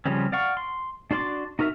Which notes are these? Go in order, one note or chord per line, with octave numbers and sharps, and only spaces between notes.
C#3 F3 G3 C4 C#4
D5 F5 F#5 C#6
C6
D4 F#4 D5 C6 D6
D#4 F#4 A#4 D#5 E5